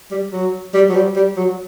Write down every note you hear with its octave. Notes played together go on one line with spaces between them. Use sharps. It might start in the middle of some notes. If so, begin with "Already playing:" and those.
G3
F#3
G3
F#3
G3
G3
F#3